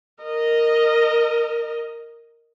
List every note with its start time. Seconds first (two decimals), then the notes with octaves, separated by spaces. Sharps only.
0.24 A#4 D#5